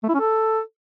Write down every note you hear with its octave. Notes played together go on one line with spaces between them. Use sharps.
A3
E4
C#4
A4